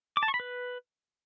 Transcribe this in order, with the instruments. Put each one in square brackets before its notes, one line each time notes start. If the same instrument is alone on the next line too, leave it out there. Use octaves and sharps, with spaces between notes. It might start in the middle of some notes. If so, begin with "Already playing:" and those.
[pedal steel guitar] D6
A5
C#6
B5
B4